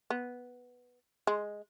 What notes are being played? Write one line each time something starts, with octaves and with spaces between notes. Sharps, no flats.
B3
G#3